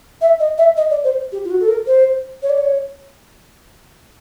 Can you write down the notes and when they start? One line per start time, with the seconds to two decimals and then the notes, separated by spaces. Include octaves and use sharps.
0.21 E5
0.40 D#5
0.58 E5
0.77 D#5
0.90 D5
1.04 C5
1.32 G4
1.45 F4
1.50 F#4
1.61 A4
1.68 A#4
1.87 C5
2.43 C#5
2.50 D5
2.58 C#5